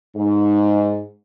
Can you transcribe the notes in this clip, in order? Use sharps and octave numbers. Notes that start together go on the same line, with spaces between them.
G#2